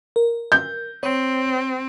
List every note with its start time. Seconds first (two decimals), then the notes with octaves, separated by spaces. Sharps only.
0.16 A#4
0.52 G6
1.03 C4 C#5